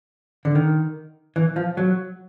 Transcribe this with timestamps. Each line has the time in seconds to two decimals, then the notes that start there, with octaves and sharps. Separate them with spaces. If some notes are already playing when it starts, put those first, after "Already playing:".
0.45 D3
0.55 D#3
1.36 E3
1.56 F3
1.77 F#3